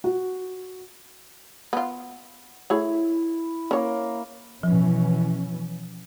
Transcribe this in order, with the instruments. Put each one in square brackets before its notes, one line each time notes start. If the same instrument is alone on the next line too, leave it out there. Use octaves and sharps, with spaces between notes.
[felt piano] F#4
[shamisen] B3 F4
[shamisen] A3 G#4 C#5 [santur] E4
[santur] A#3 A#4 [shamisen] C#4 C#5
[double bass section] B2 E3 C#4 [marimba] F3